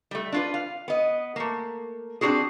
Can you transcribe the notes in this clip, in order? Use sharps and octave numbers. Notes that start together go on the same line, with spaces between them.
G3 A3
D4 F4 B4
F5
B3 D#5
A3 A#3
C4 D4 E4 F#4 G#4